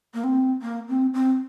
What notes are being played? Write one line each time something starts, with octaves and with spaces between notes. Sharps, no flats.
A#3
C4
A#3
C4
C4